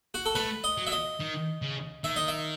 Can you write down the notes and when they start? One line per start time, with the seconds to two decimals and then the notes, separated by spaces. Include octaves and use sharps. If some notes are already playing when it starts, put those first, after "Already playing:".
0.14 F#4
0.26 A4
0.35 A3 B4
0.64 D#5
0.78 F#3
0.87 E5
0.92 D#5
1.20 D#3
1.62 C#3
2.04 D#3 E5
2.16 D#5
2.28 E5